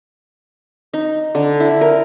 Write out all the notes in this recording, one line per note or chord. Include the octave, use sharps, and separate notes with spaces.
D#4
D3
E4
A#4